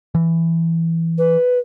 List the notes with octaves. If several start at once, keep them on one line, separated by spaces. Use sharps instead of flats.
E3
B4